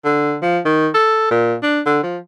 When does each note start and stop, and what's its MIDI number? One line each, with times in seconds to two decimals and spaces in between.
0.04 0.36 50
0.42 0.59 53
0.65 0.88 51
0.94 1.30 69
1.31 1.55 46
1.63 1.80 62
1.86 2.03 50
2.03 2.18 53